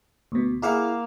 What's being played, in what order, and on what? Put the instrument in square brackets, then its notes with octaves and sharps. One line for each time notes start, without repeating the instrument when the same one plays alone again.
[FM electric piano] D2 B2
[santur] A#3 F5 E6 [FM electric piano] E4 G#4 F#5